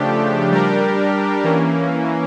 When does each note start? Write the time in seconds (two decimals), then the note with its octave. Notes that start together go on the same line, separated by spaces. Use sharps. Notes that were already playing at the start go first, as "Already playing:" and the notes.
Already playing: C#3 F3 A3 D4 G4
0.51 G3 D4 G4 A#4
1.44 E3 A#3 C#4